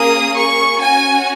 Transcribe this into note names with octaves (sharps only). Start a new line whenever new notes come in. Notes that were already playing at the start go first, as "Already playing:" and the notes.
Already playing: A#3 C#4 G#4 D#6
C#6
C#4 F#4 G#5